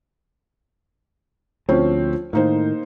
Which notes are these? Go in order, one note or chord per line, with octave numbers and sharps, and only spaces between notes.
D2 F3 C4 C#4
A2 D#3 A#3 D#4 C5